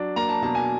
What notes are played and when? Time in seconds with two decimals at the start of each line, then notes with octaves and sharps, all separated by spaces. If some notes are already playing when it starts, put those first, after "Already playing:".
Already playing: F#3 D4
0.16 A#3 A#5
0.29 A5
0.42 B2 A5
0.55 G#5